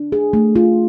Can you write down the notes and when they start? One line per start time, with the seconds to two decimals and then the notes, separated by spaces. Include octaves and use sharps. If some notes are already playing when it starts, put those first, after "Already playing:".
Already playing: D4
0.12 G#4
0.33 A3
0.56 F4